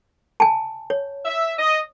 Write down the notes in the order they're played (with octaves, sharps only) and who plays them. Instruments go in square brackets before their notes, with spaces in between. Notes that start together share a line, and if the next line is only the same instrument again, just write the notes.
[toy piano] G#5 A5
C#5
[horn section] E5
D#5